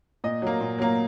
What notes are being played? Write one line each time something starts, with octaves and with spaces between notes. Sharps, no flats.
A#2 D#5
F#3 A#3
A#2
F#3 A#3